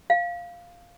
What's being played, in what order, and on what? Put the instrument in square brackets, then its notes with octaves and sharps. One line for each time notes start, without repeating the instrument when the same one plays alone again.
[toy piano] F5